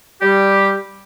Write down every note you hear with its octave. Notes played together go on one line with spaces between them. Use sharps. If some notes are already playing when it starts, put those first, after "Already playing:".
G3 G4